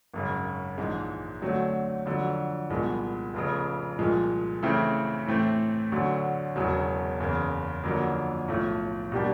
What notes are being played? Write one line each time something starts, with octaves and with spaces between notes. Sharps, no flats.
G#1 F#2 C#3
A#1 G#2 E3 G#3
D3 F#3 A3 C4
F2 D3 F#3
C2 A#2 F3 G#3 B3
F1 F2 C#3
C2 A#2 F3 G#3
C#3 E3 A3 C4 E4
A2 E3 A3 C4
D2 D3 F#3
E1 E2 C#3 F#3
F#1 E2 C#3 E3
F#1 F2 D3 F#3 A#3
B1 A2 F3 A3
B2 G3 A#3 D4 G4